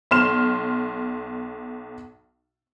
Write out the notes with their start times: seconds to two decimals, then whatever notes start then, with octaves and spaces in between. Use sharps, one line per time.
0.11 B1 C6 F6 E7